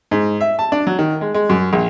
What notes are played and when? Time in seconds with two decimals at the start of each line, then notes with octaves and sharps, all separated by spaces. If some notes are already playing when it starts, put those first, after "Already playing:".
0.11 G#2
0.41 E5
0.59 A5
0.72 D4
0.87 F#3
0.99 D#3
1.21 G#3
1.34 G#3
1.49 F#2
1.73 A#1